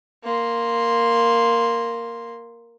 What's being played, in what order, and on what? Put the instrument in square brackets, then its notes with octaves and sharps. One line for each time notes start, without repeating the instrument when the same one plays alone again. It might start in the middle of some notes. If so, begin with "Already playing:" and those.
[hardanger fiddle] A#3 C6